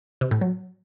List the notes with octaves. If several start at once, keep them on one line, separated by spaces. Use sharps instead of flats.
C3
A2
F#3